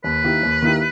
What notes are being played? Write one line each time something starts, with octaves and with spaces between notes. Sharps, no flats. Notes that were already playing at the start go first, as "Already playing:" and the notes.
D#2 B4
D#3 A#3 E4 G4
D#2
D#3 A#3 E4 G4